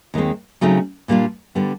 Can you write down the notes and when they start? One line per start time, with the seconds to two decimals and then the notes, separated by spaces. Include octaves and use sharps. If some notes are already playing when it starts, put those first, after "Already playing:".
0.14 D#2 D#3 G#3 C4
0.61 C#3 F#3 A3 C4 D#4
1.08 A#2 G3 A#3 D4 F4
1.55 D3 G3 B3